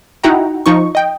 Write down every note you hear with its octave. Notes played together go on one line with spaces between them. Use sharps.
D#4 E4 F#4 F#5 G5 A#5
F3 D#4 C#6
D#5 G5